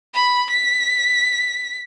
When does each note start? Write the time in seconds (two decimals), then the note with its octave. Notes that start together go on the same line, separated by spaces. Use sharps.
0.15 B5
0.50 B6